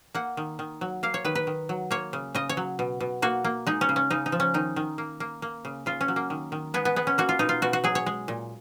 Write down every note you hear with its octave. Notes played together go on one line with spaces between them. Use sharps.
A#3 F#5
D#3
D#3
F#3
A#3 F5
C#5
D#3 B4
B4
D#3
F#3
A#3 C#5
C#3
C#3 D#5
C#5
F#3
B2
B2
A#3 F#4
A#3
G#3 D#4
C#4
C#3
C#4
C#3 D#4
D#4
F3
C#4
D#3 D#4
D#3
A#3
A#3
A#3
C#3
C#3 F4
C#4
F#3
A#3
D#3
D#3
G#3 B3
B3
G#3 B3
C#4
A#3 F#4
F4
B2 D#4
F4
B2 F#4
F#4
F#3 G#4
C#5
G#3
A#2